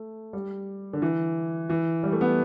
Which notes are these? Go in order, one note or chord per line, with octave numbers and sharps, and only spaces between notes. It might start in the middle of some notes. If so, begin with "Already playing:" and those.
Already playing: A3
G3
D3
E3
E3
G3
A3
B3